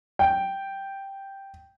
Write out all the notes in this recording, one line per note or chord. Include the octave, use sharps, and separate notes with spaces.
G5